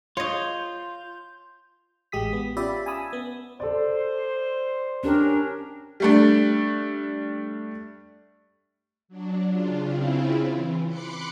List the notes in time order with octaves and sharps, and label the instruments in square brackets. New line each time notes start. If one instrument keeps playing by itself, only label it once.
[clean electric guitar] F4 [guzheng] C#5 D#5 [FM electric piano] C6 G6
[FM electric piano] A1 G#3 G4 D#6 B6
B3
C#4 F4 G4 D5 E5 B5
G#5 A5 B5 D#6 E6
B3
[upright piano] A4 D5 [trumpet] C5
[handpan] C#4 G4 A#4 [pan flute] D4
[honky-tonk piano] G3 A3 D4
[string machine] F#3 D4
C#3 D4 F4
C#3 C4 E4 F4
E3
B5 C6 D6 F#6 C#7